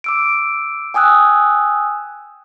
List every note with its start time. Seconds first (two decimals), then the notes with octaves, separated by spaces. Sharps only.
0.04 D6 E6 D7
0.94 G5 G#5 D#6 E6 F#6